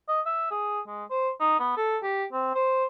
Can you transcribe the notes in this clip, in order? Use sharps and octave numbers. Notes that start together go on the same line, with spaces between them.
D#5
E5
G#4
G#3
C5
D#4
B3
A4
G4
C4
C5